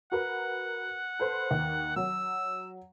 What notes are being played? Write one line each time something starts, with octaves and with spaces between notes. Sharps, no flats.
F#4 A#4 B4 F#5
A4 B4 C5
D#2
F#3 E6